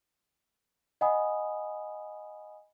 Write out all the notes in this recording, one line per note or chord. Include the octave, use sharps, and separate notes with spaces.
D#5 F#5 G#5 B5 D#6